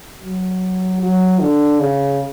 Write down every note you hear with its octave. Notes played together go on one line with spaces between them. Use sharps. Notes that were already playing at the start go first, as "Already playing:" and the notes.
F#3
F#3
D3
C#3